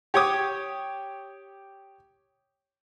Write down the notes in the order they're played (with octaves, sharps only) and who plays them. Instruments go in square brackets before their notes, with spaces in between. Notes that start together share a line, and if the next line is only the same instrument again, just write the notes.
[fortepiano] G4 C#5 D6 D#6